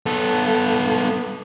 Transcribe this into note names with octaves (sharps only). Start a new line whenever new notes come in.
B3 A4